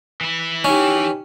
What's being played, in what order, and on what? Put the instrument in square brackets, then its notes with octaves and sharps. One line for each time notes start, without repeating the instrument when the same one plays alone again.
[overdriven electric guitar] E3 E4
[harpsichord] C#4 [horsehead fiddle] D#4 G4